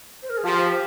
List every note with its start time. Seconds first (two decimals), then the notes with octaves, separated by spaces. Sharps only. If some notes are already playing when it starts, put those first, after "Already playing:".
0.22 C5
0.30 A#4
0.38 G#4
0.44 F3 G4